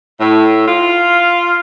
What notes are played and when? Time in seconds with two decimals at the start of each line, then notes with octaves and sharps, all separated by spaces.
0.20 A2
0.68 F4